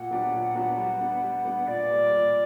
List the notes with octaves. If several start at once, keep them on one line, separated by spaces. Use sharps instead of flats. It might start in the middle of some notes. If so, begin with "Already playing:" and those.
Already playing: A#2 F#5
F#3 B3 D4 G4
A#2
F#3 B3 D4 G4
G3
B3 D4
G3
B3 D4
A#2 D5
G3 A#3
A#2